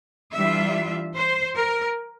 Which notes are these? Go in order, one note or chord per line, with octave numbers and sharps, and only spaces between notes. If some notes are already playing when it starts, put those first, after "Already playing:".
E3 G3 D4 F4 E5
C5
A#4